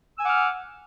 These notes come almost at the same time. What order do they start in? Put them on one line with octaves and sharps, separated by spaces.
E6 G#5 F#5 D6 F6